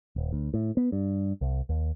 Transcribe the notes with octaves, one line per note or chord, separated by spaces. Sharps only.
D#1
D2
A2
B3
G2
C2
D#2